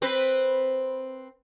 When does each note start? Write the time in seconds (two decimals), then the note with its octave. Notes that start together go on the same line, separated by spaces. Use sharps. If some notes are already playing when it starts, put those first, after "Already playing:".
0.02 C4 B4